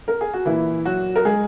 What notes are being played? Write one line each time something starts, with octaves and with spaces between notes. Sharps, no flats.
A#4
G#4
F#4
A#2 E3 A#3 E4
F#3 F#4
A#4
G#3 G#4